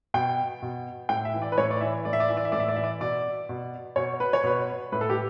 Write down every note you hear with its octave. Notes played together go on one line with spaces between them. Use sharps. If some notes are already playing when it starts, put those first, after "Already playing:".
B2 G5
B2
A2 G5
E5
E3
D5
B4
A2 C#5
D5
E3 E5
A2 D5
E5
D5
E3 E5
D5
E5
A2 D5
E5
D5
E3 E5
D5
B2 D5
B2
B2 C#5
B4
C#5
B2 B4
A2 B4
A4
G4